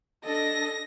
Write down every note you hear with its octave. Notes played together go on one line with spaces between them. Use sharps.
D4 A4 D#5 A#6